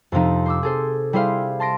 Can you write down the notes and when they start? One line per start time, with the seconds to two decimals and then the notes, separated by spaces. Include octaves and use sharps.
0.12 F2 C3 F3 D#4
0.46 C5 D6 E6
0.63 G#4 A4 C5
1.13 G3 E4 G#4 C5 F5
1.60 A5 C6 A#6 D7